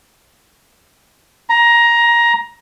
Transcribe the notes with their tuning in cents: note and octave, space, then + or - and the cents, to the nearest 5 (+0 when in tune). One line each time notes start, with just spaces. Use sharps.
A#5 +15